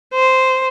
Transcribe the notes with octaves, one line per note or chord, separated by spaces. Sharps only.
C5